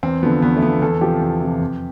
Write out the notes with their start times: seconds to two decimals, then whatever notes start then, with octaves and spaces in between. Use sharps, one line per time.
0.03 E2 C4
0.23 D3 F3 B3
0.42 E2 B3
0.57 A3
0.62 D3 F3 B3
0.82 E2 A4
1.01 C3 F3 G4
1.21 E2
1.40 C3 F3
1.60 F2